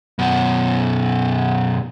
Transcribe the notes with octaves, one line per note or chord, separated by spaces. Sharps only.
F#2 B2